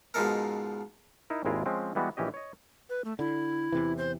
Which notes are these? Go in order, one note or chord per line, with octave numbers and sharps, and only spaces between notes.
G#2 B2 F3 D#4 A4 A#4
D#4 E4 A#4
G#1 D#2 G#3 E4 F4 A#4
F3 G#3 C4 C#4
E3 G3 G#3 B3 E4 F#4
A#1 E3 C#4 G4 D#5
C#5 D#5
B4
A3
D3 E4
E2 C3 E3
C5